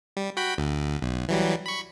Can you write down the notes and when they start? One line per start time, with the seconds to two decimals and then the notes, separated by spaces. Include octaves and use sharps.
0.17 G3
0.37 F#4 G5 B5
0.58 D2
1.02 B1
1.28 E3 F#3 G3
1.66 B5 C#6